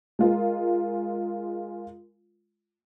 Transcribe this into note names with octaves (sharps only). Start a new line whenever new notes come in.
G#3 F4 A#4